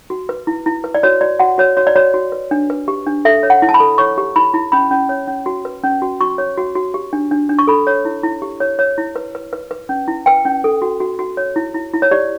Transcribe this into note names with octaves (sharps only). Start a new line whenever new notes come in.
F#4
B4
E4
E4
B4
D5
F#4 C#5
F#4 D5
F#4 F#5
F#4 C#5
F#4 C#5
D5
F#4 C#5
F#4
B4
D4
B4
G4
D4
A4 E5
C#5
F#5
E4
A5
B5
A4
C#5 C#6
G4
E4 B5
E4
C#4 B5
C#4
C#5
C#4
F#4
B4
C#4
F#4
F#4 C#6
C#5
F#4
F#4
G4
D4
D4
D4
C#6
A4 B5
C#5
E4
E4
G4
C#5
C#5
E4
B4
B4
B4
B4
C#4
E4
B4 G5
C#4
A4
F#4
F#4
F#4
C#5
E4
E4
E4
C#5
G4 D5